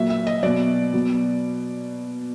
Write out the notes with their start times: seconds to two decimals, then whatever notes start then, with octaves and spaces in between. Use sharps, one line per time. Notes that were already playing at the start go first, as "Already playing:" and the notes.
Already playing: A#2 F#3 E5
0.10 E5
0.27 D#5
0.43 B2 F#3 D5
0.93 B2 F#3